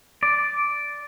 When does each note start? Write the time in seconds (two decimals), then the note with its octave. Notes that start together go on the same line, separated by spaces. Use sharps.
0.23 D5